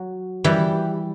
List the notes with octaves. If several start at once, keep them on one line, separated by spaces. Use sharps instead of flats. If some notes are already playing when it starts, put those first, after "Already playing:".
Already playing: F#3
E3 G3